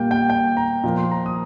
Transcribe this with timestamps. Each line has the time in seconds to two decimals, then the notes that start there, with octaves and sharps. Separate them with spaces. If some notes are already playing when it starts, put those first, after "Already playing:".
Already playing: A#2 G3 A#3 G5
0.11 G5
0.30 G5
0.57 A#5
0.84 A#2 F3 A#3
0.97 C6
1.11 A#5
1.26 D#6